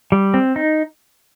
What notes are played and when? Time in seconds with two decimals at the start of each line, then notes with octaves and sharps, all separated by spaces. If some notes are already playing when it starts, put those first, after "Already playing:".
0.12 G3
0.34 C4
0.56 D#4